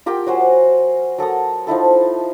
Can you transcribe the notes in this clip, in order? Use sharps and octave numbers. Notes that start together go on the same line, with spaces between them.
F4 G4 A#4 G5
F#3 F#4 C5 G#5
F#3 A4 A#4 D#6
F3 D#4 E4 A4